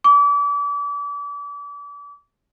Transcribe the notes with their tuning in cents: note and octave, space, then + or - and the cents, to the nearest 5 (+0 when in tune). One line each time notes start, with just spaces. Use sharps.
D6 -35